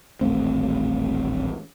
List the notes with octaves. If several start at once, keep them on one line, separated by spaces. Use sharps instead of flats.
D#1 A1 A3 C4